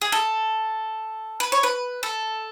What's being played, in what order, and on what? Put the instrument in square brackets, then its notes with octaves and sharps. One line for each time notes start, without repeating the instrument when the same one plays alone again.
[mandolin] G#4
A4
B4
C#5
B4
A4